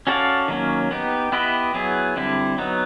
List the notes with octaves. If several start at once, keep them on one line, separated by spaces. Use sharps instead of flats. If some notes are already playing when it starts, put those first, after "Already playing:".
C#4 F#4 A4 D5 F5
D#3 F#3 A#3 C#4
B3 D#4 G4
B3 E4 G4 B4 D#5
F#3 B3 E4 G#4
D3 G3 C4 E4
F#3 B3 D#4